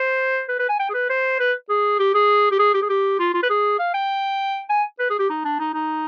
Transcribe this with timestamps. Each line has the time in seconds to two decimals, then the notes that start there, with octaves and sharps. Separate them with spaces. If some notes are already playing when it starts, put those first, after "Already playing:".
Already playing: C5
0.49 B4
0.59 B4
0.69 G#5
0.79 G5
0.89 G#4
0.94 B4
1.09 C5
1.39 B4
1.69 G#4
1.99 G4
2.14 G#4
2.51 G4
2.59 G#4
2.74 G4
2.82 G#4
2.89 G4
3.19 F4
3.34 F4
3.43 B4
3.50 G#4
3.79 F5
3.94 G5
4.70 G#5
4.99 B4
5.10 G#4
5.19 G4
5.30 D#4
5.45 D4
5.59 D#4
5.74 D#4